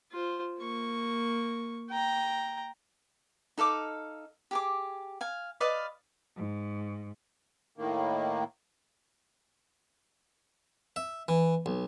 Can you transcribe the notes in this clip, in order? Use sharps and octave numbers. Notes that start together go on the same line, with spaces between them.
F4 C5
A#3 C#6
G5 A#5
D#4 A4 F5 D6
G4 G#4 D6
F5 G#5
B4 D5 D#5 F5
G#2
A2 D#3 A#3
E5
E3
B1